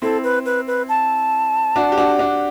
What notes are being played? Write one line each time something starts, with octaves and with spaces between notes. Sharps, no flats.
C4 E4 A4
B4
B4
B4
A5
D4 F#4
G4
D4 F#4
D4 F#4